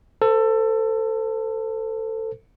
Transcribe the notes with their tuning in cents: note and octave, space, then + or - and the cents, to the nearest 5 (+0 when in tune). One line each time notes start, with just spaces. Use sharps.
A4 +20 C5 -30